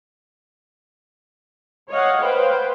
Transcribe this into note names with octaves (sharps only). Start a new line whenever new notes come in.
C#5 D#5 F5 F#5
B4 C5 F5 G5